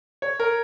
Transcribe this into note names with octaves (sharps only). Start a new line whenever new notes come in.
C#5
A#4